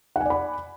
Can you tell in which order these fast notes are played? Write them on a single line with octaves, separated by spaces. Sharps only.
F#5 G#5 D5 B5